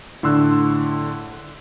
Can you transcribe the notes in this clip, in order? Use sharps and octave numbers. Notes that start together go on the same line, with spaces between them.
A2 D3 C6 E6 F#6